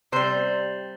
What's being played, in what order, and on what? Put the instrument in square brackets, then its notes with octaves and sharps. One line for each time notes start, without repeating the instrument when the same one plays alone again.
[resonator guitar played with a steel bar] C3 G3 C5